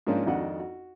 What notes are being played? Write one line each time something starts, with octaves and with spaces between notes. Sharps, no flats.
G#2 F3 A#3 C#4 D4 F4
G#1 F2 D4 F#4 D#5 F#5
F#4